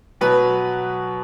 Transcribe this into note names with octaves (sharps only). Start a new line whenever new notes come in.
B2 F#3 B4